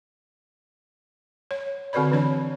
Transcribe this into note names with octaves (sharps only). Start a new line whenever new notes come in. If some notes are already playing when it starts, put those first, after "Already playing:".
C#5
D3 C4 F#4 B4 D5 B5
E3 D4 C#5 D5